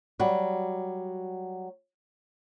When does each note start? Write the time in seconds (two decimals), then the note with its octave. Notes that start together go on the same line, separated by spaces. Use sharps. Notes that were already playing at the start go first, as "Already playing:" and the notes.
0.19 F#3 G3 F#4